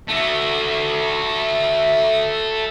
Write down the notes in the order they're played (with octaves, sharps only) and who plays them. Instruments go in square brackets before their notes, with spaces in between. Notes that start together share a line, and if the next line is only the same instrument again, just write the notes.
[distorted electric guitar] A3 F#4